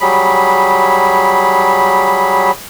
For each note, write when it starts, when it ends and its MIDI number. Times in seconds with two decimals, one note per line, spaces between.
0.01 2.51 54
0.01 2.51 55
0.01 2.51 68
0.01 2.51 83